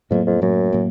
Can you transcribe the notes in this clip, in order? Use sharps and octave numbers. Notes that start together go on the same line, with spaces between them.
F2 A2 F#3 A#3
F2
F#2 A2 F#3 A#3
A2 F#3 A#3